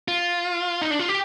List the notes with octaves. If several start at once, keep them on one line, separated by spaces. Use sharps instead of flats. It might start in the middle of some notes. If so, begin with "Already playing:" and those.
F4
D#4
D4
F4
G4